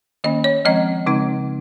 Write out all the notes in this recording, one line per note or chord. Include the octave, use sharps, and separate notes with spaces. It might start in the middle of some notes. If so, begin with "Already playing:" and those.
D#3 A#3 C#4 D#5
C#5
F3 G#3 C4 D#5
C#3 G#3 C4 D#4